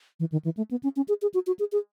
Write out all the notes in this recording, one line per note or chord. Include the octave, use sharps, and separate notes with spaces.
E3
D#3
E3
A3
B3
C#4
C#4
G#4
G#4
F#4
F#4
G#4
G#4